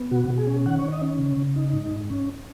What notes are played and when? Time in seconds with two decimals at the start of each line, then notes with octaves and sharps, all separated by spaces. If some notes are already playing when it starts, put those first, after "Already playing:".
Already playing: B3
0.11 B2 F#4
0.29 B2
0.38 G#4
0.47 C#4
0.66 D#3 F#5
0.79 D#3 C#5
0.92 D#5
1.02 C#4
1.19 C#3
1.37 C#3
1.56 D#4
1.73 G#2
1.91 G#2
2.10 C#4